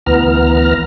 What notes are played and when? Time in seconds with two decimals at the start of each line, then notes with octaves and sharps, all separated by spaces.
0.06 D2 E3 B3 A#5 F6